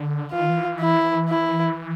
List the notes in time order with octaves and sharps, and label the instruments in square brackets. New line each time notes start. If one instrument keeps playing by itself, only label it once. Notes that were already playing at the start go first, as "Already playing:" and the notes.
Already playing: [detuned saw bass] D3
[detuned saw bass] E3 [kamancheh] F4
[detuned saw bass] D#3
E3
[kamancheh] E4
E4